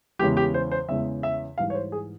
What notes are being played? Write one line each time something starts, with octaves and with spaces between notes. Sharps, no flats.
E2 C#3 E3 G#3 G4
G4
C5
C5
E2 C#3 E3 G#3 E5
E5
G#2 E3 G3 F5
C#5
C5
G#4